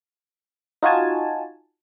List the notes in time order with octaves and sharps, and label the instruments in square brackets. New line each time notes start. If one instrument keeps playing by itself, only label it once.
[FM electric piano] D#4 F4 F#4 G#5 A5